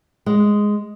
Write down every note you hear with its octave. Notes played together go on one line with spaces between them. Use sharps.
G#3